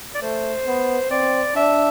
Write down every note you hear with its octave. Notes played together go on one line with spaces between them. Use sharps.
D5
A3 C5
B3
C4 D5
D4 E5